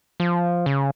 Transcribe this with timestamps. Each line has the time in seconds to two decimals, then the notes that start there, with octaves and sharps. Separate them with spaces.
0.20 F3
0.66 C#3